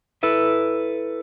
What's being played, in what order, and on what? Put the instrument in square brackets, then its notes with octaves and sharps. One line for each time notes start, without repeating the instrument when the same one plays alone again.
[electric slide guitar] E4 A4 B4 E5